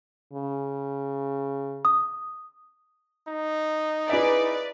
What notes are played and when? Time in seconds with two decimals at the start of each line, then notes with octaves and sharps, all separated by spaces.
0.33 C#3
1.85 D#6
3.29 D#4
4.10 E4 G#4 B4 D5 E5